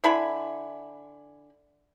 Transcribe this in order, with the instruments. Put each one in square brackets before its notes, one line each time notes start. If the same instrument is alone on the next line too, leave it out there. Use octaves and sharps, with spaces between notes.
[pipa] D3 E4 G#5 B5